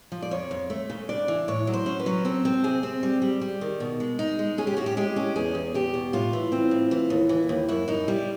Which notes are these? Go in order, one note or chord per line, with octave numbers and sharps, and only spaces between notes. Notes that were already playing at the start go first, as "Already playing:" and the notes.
F3
D5
F2 C#5
F2
A3
C#3
D4 D5
E3
A2 C#5
F#3
C5
C#4
B4
F#3
C4 A4
C4
C3 G#4
C4
G3
G3
G3
D#3
B2
G#3
D#4
G#3
C#4 G#4
G4
A2 F#4
G4
G#3 G4
C#4
E2 G#4
E2
E2 G4
B2
A2 F4
E3
C4
A2
E3
D#2
E3
D#2
F#2 E4
F#2 D#4
G3 E4